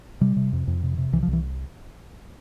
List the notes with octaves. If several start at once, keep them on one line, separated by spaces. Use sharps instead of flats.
C3 G3
C3
F2
F2
C3
C3
C2 E3
F3
C2
E3